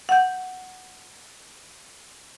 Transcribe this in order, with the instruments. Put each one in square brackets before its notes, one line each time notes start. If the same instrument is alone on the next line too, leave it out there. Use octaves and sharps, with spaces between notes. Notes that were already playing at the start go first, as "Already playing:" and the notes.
[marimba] F#5 G6